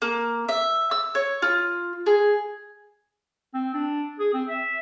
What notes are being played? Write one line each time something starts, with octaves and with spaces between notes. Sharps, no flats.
A#3
E5
E6
C#5
F4
G#4
C4
D4
G#4
C4
E5